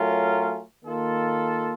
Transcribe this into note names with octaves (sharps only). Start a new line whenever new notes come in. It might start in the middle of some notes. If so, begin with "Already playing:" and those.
Already playing: F#3 A3 C#4 F4 A#4
D#3 A#3 F4 A4